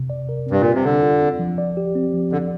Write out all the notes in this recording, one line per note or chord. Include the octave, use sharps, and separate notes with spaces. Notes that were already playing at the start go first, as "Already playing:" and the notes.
Already playing: C3
D5
A#4
G2 C4
A#2 G3
C3
D3 D5
F4
C4
F3
D5
G4
C4
F3
D3 D5